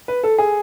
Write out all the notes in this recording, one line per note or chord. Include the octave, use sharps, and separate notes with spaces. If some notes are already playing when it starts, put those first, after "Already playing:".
B4
A4
G#4